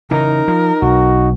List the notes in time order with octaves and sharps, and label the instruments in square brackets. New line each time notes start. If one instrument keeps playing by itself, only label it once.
[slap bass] C#3 E3 [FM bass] D#4 [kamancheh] A#4
[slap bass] F3
[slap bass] B1 [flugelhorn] F#4